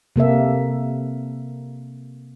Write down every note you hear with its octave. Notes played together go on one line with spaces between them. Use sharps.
C3 A#3 A4 E5